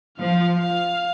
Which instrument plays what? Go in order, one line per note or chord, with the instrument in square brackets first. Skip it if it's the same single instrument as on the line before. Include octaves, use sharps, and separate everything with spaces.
[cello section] F3 [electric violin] F5
[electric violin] F5